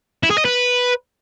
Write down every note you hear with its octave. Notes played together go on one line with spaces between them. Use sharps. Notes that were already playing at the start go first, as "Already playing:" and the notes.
E4
G#4
D#5
B4